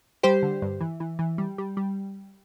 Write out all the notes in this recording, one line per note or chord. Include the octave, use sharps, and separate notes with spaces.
G3 G4 C5
D3
G2
E3
E3
E3
G3
G3
G3